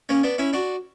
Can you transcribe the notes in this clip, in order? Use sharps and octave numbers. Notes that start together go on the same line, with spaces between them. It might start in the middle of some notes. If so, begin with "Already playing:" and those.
A#3 C#4
B3 D4
C#4 E4
D4 F#4